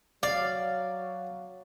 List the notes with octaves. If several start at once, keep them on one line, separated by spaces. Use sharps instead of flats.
F#3 D5 F5